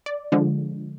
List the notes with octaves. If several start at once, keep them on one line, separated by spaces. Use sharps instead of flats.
D5
D3 F3 G#3